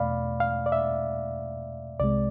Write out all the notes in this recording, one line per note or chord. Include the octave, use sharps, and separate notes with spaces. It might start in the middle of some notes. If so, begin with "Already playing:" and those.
Already playing: E2 B2 A3 D5 F5 B5
F5
D5
E5
C2 C3 G#3 D5